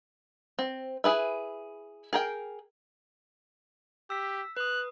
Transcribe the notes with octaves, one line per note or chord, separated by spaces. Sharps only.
C4
E4 G#4 B4 E5
G#4 A#4 G5
G4 E6 B6
B4 D#6 F#6